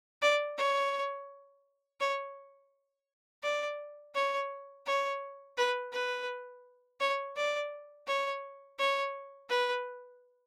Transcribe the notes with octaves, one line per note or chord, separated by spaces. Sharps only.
D5
C#5
C#5
D5
C#5
C#5
B4
B4
C#5
D5
C#5
C#5
B4